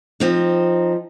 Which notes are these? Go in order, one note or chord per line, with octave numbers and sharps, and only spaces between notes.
F3 C4 D#4